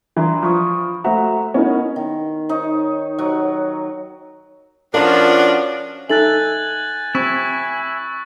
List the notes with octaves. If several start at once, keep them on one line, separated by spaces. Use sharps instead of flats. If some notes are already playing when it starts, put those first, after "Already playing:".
E3 D4 A#5 C6
F3 B5 C#6 D#6
A3 F#4 C5 E5 A#5
B3 C#4 D#4 E4 A#4
D#3
D#4 C#5
F#3 F#4
F3 C#4 D4 F4 F#4 A#4 F5 A5
D#4 A4 E5 G#5 F#6 A6 F#7
C4 E4 C#6